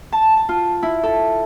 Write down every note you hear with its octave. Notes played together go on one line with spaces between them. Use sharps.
A5
A5
F4
E4
A4